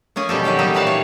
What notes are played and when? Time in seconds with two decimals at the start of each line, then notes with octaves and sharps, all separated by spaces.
0.16 A#3 C#4 G#4 G#5
0.29 B2 G3 G4 A4
0.44 D#3 F#3 G4 G5
0.59 G3 A#3 D#4 A4 E5
0.74 A#2 E3 B4 F5 A5
0.87 C#5